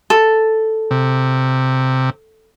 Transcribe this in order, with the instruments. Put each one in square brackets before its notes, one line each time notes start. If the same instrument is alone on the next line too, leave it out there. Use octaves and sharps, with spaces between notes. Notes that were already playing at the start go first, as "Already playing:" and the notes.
[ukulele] A4
[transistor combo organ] C3